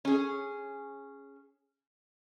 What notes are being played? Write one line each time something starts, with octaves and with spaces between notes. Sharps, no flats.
C#4 G#4